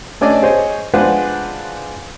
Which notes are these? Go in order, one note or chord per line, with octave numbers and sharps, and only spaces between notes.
A3 C#4 D4 D5 D#5
G#4 C5 C#5 D#5
G#3 D4 F4 B4 C5 F#5